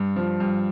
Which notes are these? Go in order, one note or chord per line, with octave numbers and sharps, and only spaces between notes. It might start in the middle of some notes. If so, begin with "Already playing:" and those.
Already playing: G2
F3
G2